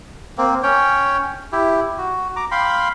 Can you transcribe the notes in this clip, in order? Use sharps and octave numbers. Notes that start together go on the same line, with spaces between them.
A#3 C4
C#4 C#5 G5
E4 G4
F#4
A#5 D6
F5 G5 B5 C6